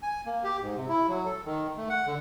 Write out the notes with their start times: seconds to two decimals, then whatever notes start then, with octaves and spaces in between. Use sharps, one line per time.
0.02 G#5
0.26 A#3
0.44 G4
0.62 G#2
0.76 C3
0.89 E4
1.08 F#3
1.25 A4
1.45 D#3
1.78 A3
1.90 F#5
2.07 D3